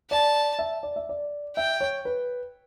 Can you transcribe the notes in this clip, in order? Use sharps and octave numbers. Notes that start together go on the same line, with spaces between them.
D5 A5
E5
D5
E5
D5
E5 G5
C#5
B4